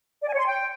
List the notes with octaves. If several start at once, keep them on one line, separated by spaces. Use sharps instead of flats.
D5
G#5
C#5
C6
G5